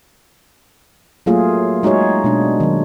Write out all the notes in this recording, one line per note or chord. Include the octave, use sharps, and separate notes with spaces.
F#3 A3 A#3 F4 G#4
G#3 D#4 F#4 G#4 C#5
B2 G#3 D4
D#3 F#3